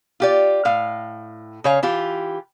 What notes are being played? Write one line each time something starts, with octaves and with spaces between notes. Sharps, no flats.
F4 G4 D5
A2 F5
C#3 C#5 F5
E3 F4 G4